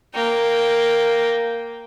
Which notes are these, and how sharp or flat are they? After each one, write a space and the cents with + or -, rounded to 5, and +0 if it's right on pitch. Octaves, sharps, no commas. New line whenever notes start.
A#3 +0 G5 -5